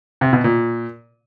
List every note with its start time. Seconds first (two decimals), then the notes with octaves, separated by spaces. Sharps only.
0.21 C3
0.33 B2
0.44 A#2